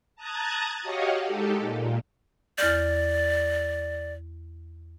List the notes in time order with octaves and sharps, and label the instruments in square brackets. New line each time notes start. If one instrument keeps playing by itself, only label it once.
[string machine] A5 A#5 D#6 F#6 G#6 A6
F#4 G4 C#5 D#5 F5 F#5
G#3 D#4 G4 A4
A#2
[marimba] E2 F6 G6 [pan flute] D5